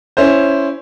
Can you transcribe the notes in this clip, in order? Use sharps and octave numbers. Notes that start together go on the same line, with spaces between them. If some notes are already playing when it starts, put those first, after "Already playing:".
C#4 E4 C5